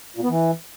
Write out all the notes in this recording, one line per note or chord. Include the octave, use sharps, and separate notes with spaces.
A#2
B3
E3